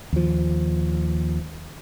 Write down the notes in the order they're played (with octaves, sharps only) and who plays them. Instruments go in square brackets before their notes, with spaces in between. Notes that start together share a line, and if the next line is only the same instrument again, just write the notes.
[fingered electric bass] D#2 F3